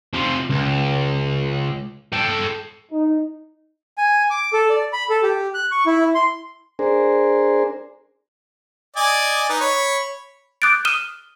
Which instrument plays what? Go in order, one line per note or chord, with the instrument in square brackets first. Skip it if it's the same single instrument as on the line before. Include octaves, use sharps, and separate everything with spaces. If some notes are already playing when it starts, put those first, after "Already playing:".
[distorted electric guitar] C3 F3
C#2
A4 G5
[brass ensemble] D#4
[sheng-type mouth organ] G#5
D6
A4
D5
B5
A4
G4
F#6
C#6
E4
C6
[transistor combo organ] D4 G#4 A#4 C5
[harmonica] D5 D#5 G#5
D#4 B4
C#5 B5
[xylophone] D6 D#6 F#6 G6 A6 D7
D#6 F6 D#7 E7 G7